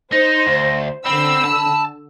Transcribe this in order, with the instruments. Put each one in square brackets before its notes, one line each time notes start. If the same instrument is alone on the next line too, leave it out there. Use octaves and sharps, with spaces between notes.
[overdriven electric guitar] D#4 [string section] C5 [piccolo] A#6
[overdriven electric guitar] D2
[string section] D3 E6 [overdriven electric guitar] C4 [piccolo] B5
[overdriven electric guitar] A5